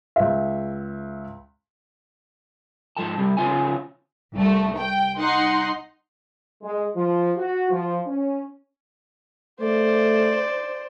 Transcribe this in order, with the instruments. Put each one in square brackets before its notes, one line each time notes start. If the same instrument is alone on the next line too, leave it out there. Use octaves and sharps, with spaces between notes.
[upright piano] C#2 E5
[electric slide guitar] G#2 F3 A4 A5
C3 G3
C#3 E3 B3 F4 C#5 G#5
[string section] C2 A3
G5
D#4 F#5 C6
[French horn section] G#3
F3
F#4
F3
C#4
[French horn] A3 [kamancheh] C5 D5